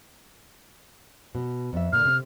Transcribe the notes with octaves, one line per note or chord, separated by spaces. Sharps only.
B2
F2 E5
A#2 D3 F6
C3